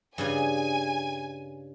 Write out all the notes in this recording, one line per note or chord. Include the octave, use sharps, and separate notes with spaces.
G2 C#3 G#4 G#5